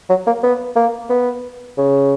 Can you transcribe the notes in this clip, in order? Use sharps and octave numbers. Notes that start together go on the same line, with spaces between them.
F#3
A#3
B3
A#3
B3
C#3